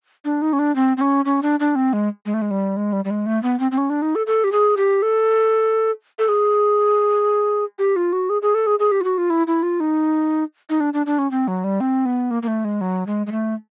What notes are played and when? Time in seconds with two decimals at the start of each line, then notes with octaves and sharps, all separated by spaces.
0.25 D4
0.42 D#4
0.53 C#4
0.59 D4
0.75 C4
0.97 C4
1.01 C#4
1.25 C#4
1.42 D4
1.60 D4
1.75 C4
1.93 G#3
2.26 G#3
2.34 A3
2.42 G#3
2.51 G3
2.77 G#3
2.93 G3
3.05 G3
3.10 G#3
3.26 A3
3.43 B3
3.60 C4
3.71 C4
3.78 C#4
3.90 D4
4.02 D#4
4.15 A4
4.27 A4
4.44 G4
4.52 G#4
4.77 G4
5.02 A4
6.19 A4
6.28 G#4
7.79 G4
7.96 F4
8.12 F#4
8.29 G#4
8.42 G#4
8.54 A4
8.67 G#4
8.79 G#4
8.91 G4
9.01 F4
9.04 F#4
9.18 F4
9.30 E4
9.47 E4
9.63 F4
9.80 D#4
10.69 D#4
10.80 D4
10.93 D4
11.06 D4
11.18 C#4
11.31 C4
11.48 F#3
11.64 G3
11.80 C4
12.05 B3
12.31 A#3
12.42 A#3
12.48 A3
12.65 G#3
12.81 F#3
13.07 G#3
13.27 G#3
13.31 A3